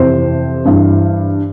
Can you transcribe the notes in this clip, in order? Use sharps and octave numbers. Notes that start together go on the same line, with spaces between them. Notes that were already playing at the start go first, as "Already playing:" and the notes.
Already playing: F2 C3 E3 C5
G2 E3